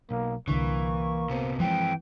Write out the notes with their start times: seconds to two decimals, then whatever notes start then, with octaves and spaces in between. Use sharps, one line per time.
0.11 B1 A#3
0.48 C2 D3 E3 A#3 C#6
1.30 C3 B3 C5
1.60 E3 F3 G#3 C4 G5